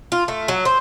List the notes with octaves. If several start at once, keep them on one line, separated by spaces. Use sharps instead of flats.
F4
A3
F#3
C5